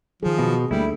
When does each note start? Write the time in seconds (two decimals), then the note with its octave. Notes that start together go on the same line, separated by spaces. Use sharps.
0.23 D#3 F3 F#3 G#4
0.39 B2
0.71 D2 D3 G3 A3 A#3 E4